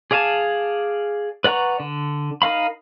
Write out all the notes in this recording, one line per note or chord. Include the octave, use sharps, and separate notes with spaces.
G#4 D5 F5 G#5 A5
B4 D5 F#5 A#5 C#6
D3
D#4 A#4 F5 B5